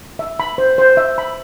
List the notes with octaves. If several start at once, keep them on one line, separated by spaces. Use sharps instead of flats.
E5
B5
C5
C5
E5
B5